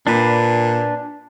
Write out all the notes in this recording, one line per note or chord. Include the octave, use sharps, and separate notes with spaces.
A#2 D4 B4